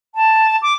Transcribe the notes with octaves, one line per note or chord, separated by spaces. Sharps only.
A5
D6